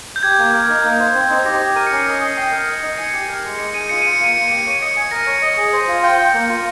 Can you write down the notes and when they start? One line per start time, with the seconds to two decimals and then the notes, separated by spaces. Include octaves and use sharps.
0.16 G6
0.23 G4 G#6
0.38 A#3
0.54 A#4
0.69 D#4
0.84 A#3
1.00 C5
1.15 C4
1.30 D#4
1.45 G4 A#6
1.61 G4
1.75 A#4 D#7
1.87 C#4 C#7
1.96 C7
2.07 D#5 A#6
2.16 C#7
2.21 D#5
2.26 C7
2.37 G5 C7
2.52 A#4
2.68 D#5
2.83 D#4
2.98 G#5 C#7
3.13 G4
3.29 A#4
3.44 G#3
3.59 D#4 C#7
3.74 G#4 D#7
3.89 F4 C#7
4.02 F4 D#7
4.12 C#7
4.20 A#3 D#7
4.36 A#3 C#7
4.47 G4 D#7
4.59 C#7
4.66 C#5 D#7
4.81 D#5 C#7
4.96 G#5
5.11 A#4 A#6
5.27 C#5
5.42 D#5
5.57 G#4
5.73 C5
5.88 F4
6.03 G5
6.18 G5
6.34 A#3 C#7
6.49 F4